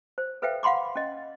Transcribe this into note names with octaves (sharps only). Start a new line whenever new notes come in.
C5
A4 B4 C5 E5 F5 G5
F5 F#5 B5 C6 D6
C#4 D#5